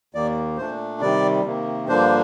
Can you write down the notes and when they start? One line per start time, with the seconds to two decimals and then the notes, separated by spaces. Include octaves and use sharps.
0.14 D#2 D#3 A#3 D5
0.57 A#2 A3 D4 C5
1.01 C3 D#3 G3 D5
1.45 C3 D#3 A#3
1.88 G2 D3 F3 A#3 D4 C5